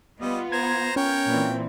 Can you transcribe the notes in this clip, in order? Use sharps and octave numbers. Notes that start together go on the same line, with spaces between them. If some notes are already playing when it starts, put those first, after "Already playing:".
G3 B3 F4 D#5
C5 A#5 G#6
C#4 A#4 C#5 G5
A#2 E3 C4